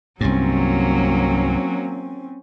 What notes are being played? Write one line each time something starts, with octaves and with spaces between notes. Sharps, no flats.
C2 G2 F#3 A#3 C4 C#4